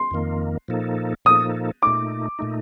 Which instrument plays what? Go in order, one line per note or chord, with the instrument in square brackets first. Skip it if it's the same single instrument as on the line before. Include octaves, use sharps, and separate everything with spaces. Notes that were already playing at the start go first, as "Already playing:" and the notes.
Already playing: [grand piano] C6
[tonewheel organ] F2 D#3 A#3
A#2 F3 A#3 D#4 A4
[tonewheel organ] A#2 F3 A#3 D#4 A4 [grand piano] D#6
[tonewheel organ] A#2 A3 D#4 [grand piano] D6
[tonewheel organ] A#2 A3 D#4